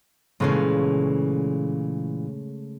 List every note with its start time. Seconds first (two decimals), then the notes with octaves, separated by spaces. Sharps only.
0.40 A#2 C#3 E3 G#3 A3 C#4